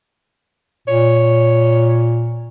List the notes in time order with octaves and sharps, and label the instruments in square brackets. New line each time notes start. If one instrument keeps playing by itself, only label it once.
[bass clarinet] A#2 [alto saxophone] C#5